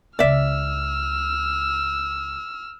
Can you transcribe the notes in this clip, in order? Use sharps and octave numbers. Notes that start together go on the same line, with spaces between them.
C#2 C#3 D5 E5 E6 F6